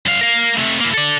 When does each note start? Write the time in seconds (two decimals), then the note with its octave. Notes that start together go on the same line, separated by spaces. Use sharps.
0.06 F#2 F5
0.21 A#4 F5
0.58 C3 A3
0.80 A#3 E4
0.94 A4 D5